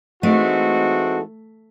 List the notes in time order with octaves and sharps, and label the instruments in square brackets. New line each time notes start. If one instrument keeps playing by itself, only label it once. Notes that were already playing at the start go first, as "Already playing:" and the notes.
[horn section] E3 G#3 C4 D#4 F#4 [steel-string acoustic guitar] A3